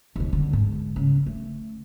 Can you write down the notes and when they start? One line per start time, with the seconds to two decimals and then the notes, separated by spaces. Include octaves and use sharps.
0.16 D#2 B2
0.33 D3
0.53 G#2
0.96 C#3
1.26 A3